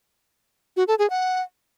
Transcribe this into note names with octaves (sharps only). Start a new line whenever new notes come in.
F#4
A4
G#4
F#5